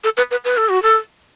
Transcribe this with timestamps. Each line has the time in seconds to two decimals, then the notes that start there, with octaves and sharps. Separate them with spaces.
0.04 A4
0.17 B4
0.31 B4
0.45 B4
0.57 A4
0.69 F#4
0.83 A4